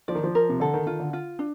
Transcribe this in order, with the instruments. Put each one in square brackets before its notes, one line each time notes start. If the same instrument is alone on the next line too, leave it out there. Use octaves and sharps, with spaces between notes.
[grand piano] F3 [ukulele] D5
[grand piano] D#3
F3
[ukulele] A#4
[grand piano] C3
[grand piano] D3 [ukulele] A4
[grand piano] D#3
[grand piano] D#3 [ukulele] F4
[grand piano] D3
[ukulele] F4
D4